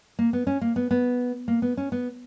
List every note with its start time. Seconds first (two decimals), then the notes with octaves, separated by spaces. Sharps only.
0.19 A#3
0.33 B3
0.47 C#4
0.61 A#3
0.76 B3
0.91 B3
1.48 A#3
1.62 B3
1.77 C#4
1.92 B3